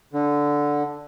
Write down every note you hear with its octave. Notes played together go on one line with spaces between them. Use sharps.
D3